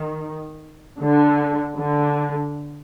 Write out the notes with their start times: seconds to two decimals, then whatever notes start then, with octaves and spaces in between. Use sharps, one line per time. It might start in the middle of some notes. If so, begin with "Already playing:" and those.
Already playing: D#3
1.01 D3
1.79 D3